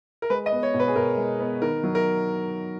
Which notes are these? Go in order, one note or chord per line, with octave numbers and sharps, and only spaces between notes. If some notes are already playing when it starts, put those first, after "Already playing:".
A#4
G#3 B4
D#5
B3
C#5
B2
B4
G#4
B2 A#4
G#3
B3
D#3 A#4
F#3
A#4